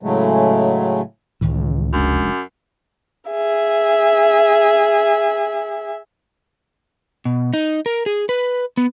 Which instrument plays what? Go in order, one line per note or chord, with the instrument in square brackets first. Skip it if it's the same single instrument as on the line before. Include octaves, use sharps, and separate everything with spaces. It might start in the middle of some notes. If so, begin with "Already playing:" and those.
[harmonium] A2 C#3 F#3 G#3 A3
[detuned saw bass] C#2 [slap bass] A2 D#3 E3
[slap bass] F1 G#3 D4 [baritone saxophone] F#2
[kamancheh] G#4 E5
[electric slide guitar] B2
D#4
A#4
G#4
B4
B3